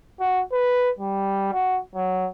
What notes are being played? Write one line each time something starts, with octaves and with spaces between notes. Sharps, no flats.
F#4
B4
G3
F#4
F#3